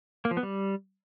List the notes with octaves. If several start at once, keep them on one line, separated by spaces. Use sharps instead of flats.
A#3
F3
B3
G3